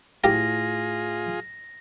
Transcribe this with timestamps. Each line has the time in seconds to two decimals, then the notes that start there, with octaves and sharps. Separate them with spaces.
0.24 A2 F4 G4 G#4 F5 A#5 A#6